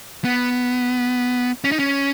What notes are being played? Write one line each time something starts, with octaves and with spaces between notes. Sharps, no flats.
B3
C#4
D#4
C#4